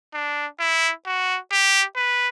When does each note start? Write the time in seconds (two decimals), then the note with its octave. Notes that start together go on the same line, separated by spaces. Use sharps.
0.14 D4
0.60 E4
1.06 F#4
1.52 G4
1.96 B4